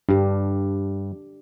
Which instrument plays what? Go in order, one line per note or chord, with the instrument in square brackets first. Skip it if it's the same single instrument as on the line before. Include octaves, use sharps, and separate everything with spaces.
[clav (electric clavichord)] G2 [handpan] D4 G4